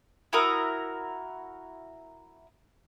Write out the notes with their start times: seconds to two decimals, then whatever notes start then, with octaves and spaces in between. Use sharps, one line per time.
0.33 E4 F#4 A#4 D#6